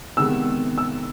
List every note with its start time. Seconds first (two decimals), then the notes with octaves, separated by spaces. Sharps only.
0.17 C3 D#3 G#3 B3 E6
0.78 E6